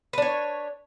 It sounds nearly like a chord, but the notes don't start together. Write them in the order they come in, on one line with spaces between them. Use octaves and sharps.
B4 D4 C#5